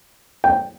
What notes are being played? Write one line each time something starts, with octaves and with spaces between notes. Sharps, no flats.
G5